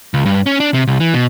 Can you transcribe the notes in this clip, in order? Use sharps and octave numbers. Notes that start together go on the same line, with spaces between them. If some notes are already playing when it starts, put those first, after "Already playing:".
C#2
G2
C#4
D4
C3
C2
E3
B2